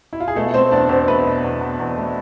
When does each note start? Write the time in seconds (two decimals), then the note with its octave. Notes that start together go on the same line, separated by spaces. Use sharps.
0.13 E4
0.20 F4
0.28 G#4
0.35 B2 A3 A4
0.53 A3 C4 C5
0.71 E2 D4 D5
0.89 E2 C4 C5
1.08 A3 B3 B4
1.26 B2
1.44 E2
1.61 E2
1.80 E2
1.97 A3